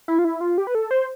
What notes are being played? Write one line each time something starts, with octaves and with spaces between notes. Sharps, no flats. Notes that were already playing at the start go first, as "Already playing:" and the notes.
E4
F4
E4
F4
G4
B4
A4
C5